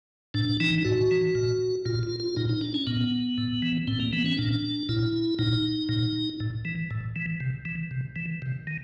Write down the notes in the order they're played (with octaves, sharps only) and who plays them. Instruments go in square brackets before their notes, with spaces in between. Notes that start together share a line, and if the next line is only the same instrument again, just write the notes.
[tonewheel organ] A2 D4
E3 D#4
A2 F#4
E3
A#2
A#2 F4
F4
F4
A#2 D#4
D#4
D4
C#4
A#2 B3
A2
E3
A2 C4
A#3
E3 B3
C#4
A#2 D4
A#2 E4
A#2 D#4
A#2
A2
E3
A2
E3
C3
E3
C3
E3
C3
D#3